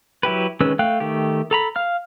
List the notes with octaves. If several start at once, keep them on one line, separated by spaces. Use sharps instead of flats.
F#3 E4 G4 B4
D#3 G#3 C#4 B4 E6
A3 F5 G5 F#6
D#3 A3 G4
A4 A#5 B5
F5 F6